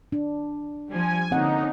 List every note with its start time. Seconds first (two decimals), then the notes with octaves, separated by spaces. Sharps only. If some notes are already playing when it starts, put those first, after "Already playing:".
0.12 D4
0.91 F3 G3 G#5
1.31 D3 A#3 C4 C#4 D#4 F#5